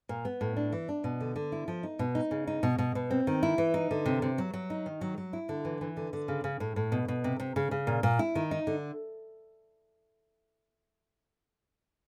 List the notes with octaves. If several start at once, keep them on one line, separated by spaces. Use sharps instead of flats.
A#2
B3
A2
D4
E3
D4
B2
D3
D3
E4
F3
D#4
B2
D#4
C#3
D#4
B2
B2
B2
C4
D#3
E4
E3
D#4
D3
C3
C3
F#3
F#3
D#4
D#3
F#3
F#3
E4
D3
E3
E3
D3
D3
C#3
C#3
A2
A2
B2
B2
C3
C3
C#3
C#3
A#2
A#2
E4
D#3
D#4
D3